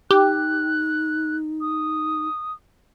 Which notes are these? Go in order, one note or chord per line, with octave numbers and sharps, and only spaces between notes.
D#4 G4 F#6
D#6